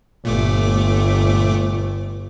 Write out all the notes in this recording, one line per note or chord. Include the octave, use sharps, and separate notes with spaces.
G1 A#2 A3 D6